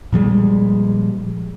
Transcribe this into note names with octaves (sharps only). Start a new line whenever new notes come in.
A#2 F3 G3 G#3